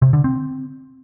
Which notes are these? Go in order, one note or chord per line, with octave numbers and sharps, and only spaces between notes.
C3
D3
C4